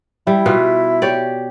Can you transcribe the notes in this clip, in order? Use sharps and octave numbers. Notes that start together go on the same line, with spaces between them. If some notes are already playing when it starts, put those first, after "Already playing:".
G3 E4
B2 F4 B4
G4 C#5 D5